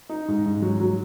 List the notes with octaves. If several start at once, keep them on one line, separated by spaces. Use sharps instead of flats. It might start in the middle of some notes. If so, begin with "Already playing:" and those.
D#4
G#2
G#2
F#3
F#3